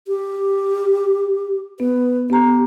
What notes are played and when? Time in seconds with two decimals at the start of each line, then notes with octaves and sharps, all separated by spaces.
0.08 G4
1.80 B3 B4
2.30 B3 G4 A#5